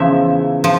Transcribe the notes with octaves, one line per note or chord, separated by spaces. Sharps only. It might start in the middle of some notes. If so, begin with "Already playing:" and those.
Already playing: E2 C#3 F3 E5
F3